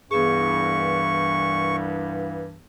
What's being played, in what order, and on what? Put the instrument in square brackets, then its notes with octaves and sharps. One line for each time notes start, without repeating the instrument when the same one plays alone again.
[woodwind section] C2 G2 E3 [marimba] B3 D4 G#4 [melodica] C#6